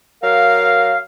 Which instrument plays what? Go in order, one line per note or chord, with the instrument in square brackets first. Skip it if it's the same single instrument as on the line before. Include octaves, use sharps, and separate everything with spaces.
[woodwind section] F#3 A#4 F5